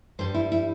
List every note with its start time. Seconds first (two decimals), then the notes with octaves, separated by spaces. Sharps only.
0.19 G2 G3 C5
0.34 E4
0.52 E4